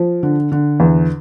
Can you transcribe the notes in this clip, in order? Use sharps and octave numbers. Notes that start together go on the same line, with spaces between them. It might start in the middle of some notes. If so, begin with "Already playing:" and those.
Already playing: F3
D3
D3
E2